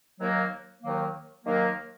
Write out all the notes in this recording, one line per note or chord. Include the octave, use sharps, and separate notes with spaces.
D#2 D#3 F#3 A#3
D#2 D#3 F#3 A#3
D#2 D#3 F#3 A#3